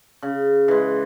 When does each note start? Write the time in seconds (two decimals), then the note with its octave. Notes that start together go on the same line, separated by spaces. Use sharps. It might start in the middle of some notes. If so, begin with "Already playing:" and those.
0.22 C#3
0.68 E3 G#3